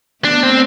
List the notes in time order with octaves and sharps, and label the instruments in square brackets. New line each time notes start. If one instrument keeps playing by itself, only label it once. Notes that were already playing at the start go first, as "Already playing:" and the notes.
[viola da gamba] A3 B3 [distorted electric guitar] D4
[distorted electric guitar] C4